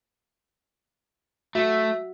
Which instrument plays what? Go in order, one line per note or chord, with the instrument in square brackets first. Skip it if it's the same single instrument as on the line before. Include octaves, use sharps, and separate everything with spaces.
[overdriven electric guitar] A3 [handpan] F#4 [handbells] E5